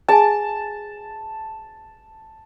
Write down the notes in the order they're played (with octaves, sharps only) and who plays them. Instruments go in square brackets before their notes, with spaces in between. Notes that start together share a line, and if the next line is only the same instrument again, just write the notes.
[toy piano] G#4 G#5 [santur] A5